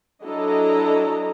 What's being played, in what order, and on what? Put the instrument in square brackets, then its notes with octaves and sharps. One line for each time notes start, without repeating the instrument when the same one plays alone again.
[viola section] F#3 D4 E4 A4 D#5 A#5